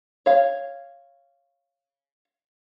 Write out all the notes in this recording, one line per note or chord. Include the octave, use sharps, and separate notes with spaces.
C#5 F5